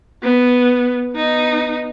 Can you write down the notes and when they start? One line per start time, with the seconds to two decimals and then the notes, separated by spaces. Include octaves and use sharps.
0.23 B3
1.13 B3 D#4